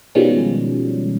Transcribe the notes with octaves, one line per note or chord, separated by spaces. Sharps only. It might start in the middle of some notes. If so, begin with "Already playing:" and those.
B2 D#3 F3 G3 G#3 C#4